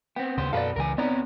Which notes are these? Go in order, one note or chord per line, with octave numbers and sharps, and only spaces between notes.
B3 C4 G5
D#2 C#3 B3 C5
F#2 B2 A4 B4 D5 F5
C#2 C#3 E3 A#4 G#5
B3 C4 D#4 C#5 D5 A#5